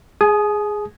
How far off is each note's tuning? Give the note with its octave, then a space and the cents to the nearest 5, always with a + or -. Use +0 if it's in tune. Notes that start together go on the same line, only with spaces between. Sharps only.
G#4 +0 G#5 +40 D#6 +0